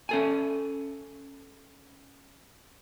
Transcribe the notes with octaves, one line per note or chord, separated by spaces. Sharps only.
C#4 A4 G#5